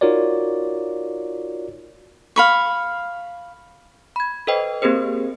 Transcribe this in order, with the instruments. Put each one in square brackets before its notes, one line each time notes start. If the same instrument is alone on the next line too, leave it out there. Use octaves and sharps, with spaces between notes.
[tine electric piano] D#4 F4 F#4 A#4 C#5 D5
[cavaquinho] F5 B5 C#6
[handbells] B5 G#6
A4 B4 C5 D#5 G5
A#3 C4 G4 G#4 A#4 C5